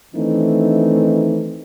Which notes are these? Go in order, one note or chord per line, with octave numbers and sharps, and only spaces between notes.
D#3 E3 A3 C4 D4 D#4